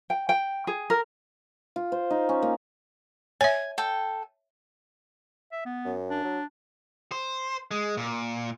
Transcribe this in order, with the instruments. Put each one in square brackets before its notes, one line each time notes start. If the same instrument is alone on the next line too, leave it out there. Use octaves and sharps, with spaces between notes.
[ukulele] G5
G5
G#4
A#4
[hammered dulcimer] F4
C5
D#4
C#4
A#3
[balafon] C#5 E5 [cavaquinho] G#5
[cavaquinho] A4 G5
[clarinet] E5
B3
[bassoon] F#2
[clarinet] D4
[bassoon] F#3
[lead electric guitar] C5
G#3
A#2